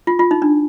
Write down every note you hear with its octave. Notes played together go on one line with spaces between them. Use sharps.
F4
F4
D#4
D4